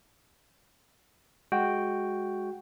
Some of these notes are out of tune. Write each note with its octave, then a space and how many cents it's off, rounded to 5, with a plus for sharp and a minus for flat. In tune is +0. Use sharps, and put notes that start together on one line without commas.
G#3 +0 F#4 +0 G5 +0